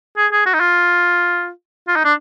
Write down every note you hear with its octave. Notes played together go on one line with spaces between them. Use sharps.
G#4
G#4
F#4
D#4
F4
F4
D#4
D4